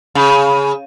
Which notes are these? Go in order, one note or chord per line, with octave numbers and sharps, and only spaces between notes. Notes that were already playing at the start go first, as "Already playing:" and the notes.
C#3